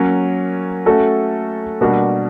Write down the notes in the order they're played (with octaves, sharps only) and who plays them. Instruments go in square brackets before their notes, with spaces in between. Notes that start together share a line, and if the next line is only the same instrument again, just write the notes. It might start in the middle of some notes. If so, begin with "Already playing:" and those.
Already playing: [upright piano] F#3 A#3 C#4
A3 C#4 F#4 A4
B2 G3 A#3 D4 F#4